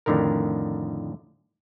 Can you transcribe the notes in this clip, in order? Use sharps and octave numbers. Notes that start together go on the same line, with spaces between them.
F2 A2 D3 D#3 A#4